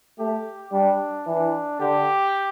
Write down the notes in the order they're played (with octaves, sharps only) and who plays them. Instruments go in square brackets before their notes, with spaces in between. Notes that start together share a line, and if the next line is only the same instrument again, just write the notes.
[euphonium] A3 [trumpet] G4
[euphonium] G3 [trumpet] D4
[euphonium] E3 [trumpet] D4
[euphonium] D3 [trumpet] G4